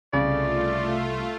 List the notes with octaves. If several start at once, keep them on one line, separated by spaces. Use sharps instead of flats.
C2 C#3 A3 F4 D5